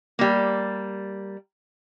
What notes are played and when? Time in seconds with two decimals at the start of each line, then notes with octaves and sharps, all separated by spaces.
0.19 G3 A#3